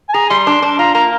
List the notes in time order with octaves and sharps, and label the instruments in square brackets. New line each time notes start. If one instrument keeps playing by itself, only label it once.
[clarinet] G#5
[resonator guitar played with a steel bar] G#4 [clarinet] A#5
[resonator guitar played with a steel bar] G3 [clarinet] C6
[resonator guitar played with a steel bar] D4
D4
[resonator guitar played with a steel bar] F4 [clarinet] A#5
[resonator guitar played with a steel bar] A#3 [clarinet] A#5